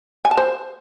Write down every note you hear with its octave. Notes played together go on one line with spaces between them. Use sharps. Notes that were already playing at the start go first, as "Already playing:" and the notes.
G#5
A5
C5